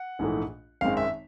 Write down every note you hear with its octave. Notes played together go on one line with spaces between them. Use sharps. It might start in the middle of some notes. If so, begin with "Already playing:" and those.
Already playing: F#5
A#1 G#2 E3 A3
G#1 F#2 D#3 G#3 C4 F5
E5